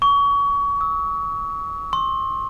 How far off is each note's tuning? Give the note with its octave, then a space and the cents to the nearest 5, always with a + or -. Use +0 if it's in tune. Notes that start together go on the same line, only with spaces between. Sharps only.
C#6 +30
E6 -40
C6 +35